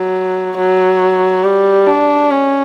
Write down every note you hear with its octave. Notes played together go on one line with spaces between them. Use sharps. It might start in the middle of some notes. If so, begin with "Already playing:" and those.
Already playing: F#3
F#3
G3
D4
C#4